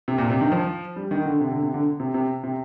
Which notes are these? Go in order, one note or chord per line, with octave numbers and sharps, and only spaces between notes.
C3
A#2
C3
D#3
F3
G3
D#3
D3
C3
D3
C3
D3
C3
C3
C3